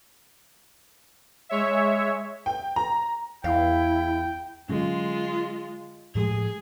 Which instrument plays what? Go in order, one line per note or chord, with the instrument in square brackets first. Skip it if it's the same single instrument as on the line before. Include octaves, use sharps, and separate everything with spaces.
[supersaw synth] G#3 C#5 E5
[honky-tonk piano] G5
A#5
[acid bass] E2 [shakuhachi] E4 [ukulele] F5 [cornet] G5
[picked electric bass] D3 F#3 C#4 [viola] G#3 F4
[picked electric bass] A2 F3 G#3 [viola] G#4